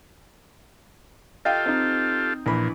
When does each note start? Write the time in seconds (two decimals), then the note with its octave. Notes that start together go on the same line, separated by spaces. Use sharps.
1.45 F4 G4 A4 D#5 F5 G5
1.66 C4 D#4
2.46 A#1 A#2 E3 B5